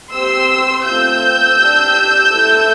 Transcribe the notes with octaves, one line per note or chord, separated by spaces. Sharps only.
C4 G4 C6 E6
A3 C4 F4 E6 G6
D4 G4
A3 E4 A4